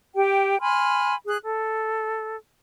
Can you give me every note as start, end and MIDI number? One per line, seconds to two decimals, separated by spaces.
0.15 0.60 67
0.15 0.60 79
0.60 1.15 80
0.60 1.15 83
0.60 1.15 84
0.60 1.15 89
1.27 1.37 68
1.27 1.37 90
1.43 2.35 69